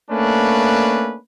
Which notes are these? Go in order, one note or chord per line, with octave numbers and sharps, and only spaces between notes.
A3 A#3 C#4 D4 B4